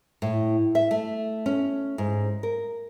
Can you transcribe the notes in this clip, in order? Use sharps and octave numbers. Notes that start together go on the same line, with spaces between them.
A2
E5
A3
C#4
G#2
A#4